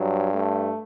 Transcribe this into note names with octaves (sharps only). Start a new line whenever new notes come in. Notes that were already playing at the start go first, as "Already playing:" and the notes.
Already playing: G2 F#3
A3